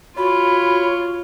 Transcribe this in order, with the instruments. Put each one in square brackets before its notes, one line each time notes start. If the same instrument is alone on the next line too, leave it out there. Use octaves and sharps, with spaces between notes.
[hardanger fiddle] F4 [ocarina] F#4 [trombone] C#5 [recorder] B5